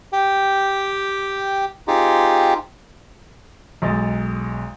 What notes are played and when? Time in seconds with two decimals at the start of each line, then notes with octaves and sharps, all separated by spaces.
0.13 G4 G5
1.88 C4 D#4 F4 G4 G#4
3.82 B1 G#3 D#5 A6